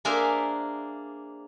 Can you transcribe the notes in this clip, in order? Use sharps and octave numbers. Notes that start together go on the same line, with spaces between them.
A#3 D4 G#4 A#4 C5 E5